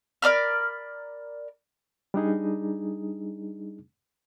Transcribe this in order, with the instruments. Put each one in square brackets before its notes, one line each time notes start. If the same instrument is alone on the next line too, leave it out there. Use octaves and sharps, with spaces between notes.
[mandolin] A#4 D5 B5 F6
[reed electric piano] G3 D4 D#4 G#4